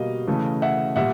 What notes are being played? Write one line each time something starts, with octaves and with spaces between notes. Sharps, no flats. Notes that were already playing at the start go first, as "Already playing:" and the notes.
Already playing: B2 G3 A#3 D#5 F5
C#3 E3 A3
E5 F#5
A#2 G3 E5 F#5